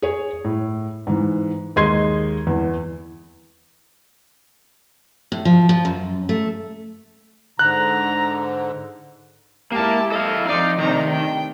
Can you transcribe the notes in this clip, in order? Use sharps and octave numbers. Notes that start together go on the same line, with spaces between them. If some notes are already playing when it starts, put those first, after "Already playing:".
G#4 C#5
A2
G#2 E3
D#2 G#3 D#5 C6 G#6 C7
E2 E3
A2
F3
F3
F#2
A3
G#2 D3 A#5 F#6
G#3 A#3 E4 G4 A5
A4 D#5 F5
F3 C4 D#4 E4 D5 F5
C3 D#3 A3 D4 D#4 A#5
G5